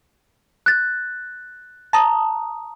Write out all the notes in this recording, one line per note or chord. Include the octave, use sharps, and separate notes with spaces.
F#6 A6
A5 A#5 D#6